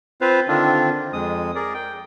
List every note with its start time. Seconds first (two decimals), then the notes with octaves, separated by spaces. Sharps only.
0.21 C4 F4 B4 C5 F5
0.48 D3 D#3 C4 D4 F4
1.13 F2 G#3 D#6
1.55 G#4 A#4 D5
1.74 G5